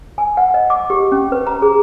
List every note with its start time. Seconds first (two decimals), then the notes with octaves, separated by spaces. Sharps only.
0.18 G#5
0.37 F#5
0.54 D#5
0.70 D6
0.90 G4
1.12 C#4
1.32 B4
1.47 A#5
1.62 G#4